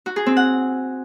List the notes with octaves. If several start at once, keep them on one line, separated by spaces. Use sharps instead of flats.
F#4
G#4
C4
F#5